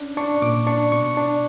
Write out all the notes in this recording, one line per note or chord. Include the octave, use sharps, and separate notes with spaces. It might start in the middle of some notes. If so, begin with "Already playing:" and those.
Already playing: C#4 D4
D4 C#6
A#2 D6
D4 C#6
B2 C#6
D4